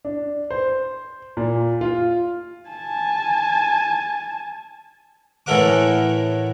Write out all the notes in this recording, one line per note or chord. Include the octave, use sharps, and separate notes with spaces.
D4
C5
A#2
F4
G#5 A5
A2 E3 A4 A#4 F#5 D6